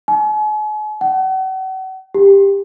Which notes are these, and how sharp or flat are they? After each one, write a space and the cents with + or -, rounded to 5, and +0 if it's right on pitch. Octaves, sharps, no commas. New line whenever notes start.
G#5 +40
F#5 +40
G4 +15